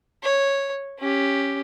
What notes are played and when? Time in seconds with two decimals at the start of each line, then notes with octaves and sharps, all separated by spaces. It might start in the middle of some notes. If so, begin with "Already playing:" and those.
0.23 C#5
0.99 C#4 G4